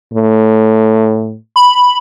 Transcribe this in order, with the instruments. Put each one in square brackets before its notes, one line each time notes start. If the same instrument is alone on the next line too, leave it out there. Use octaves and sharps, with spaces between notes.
[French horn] A2
[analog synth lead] B5